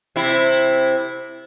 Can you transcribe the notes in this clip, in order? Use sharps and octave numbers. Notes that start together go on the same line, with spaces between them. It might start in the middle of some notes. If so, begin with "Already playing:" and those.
C3 E4